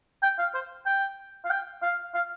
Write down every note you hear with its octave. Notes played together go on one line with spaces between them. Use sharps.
G5
F5
C5
G5
F5
G5
F5
F5